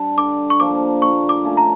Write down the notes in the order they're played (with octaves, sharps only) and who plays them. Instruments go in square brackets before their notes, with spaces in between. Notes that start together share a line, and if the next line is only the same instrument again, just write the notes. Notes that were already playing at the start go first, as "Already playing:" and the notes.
Already playing: [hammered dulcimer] G3 D4
[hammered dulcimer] D3 [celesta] D6
[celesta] C#6
[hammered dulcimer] F3 A#3 [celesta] D6
[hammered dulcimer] A#2 [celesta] C#6
[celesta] D6
[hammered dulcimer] A3 C#4 F4
[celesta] A#5